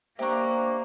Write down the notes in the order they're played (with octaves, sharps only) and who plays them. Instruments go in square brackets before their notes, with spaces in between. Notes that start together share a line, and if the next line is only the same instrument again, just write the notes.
[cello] A#3 [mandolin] D4 G4 [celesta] C5 A#5 [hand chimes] E5 C#6